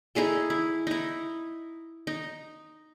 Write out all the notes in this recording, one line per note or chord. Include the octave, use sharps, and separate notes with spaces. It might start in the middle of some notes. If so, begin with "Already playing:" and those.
D#4 E4 G#4 A4
E4
D#4 E4
D#4